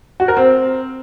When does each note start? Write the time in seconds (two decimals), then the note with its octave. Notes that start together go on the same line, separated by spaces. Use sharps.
0.20 F#4
0.28 A#4
0.37 C4